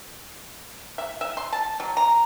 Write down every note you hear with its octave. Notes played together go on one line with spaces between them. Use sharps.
E5
E5
C6
A5
F#3
A#5